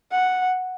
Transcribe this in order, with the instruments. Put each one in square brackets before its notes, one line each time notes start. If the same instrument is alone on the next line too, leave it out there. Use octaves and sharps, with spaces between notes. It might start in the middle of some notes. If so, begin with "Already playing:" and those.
[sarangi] F#5